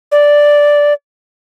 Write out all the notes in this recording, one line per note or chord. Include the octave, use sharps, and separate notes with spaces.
D5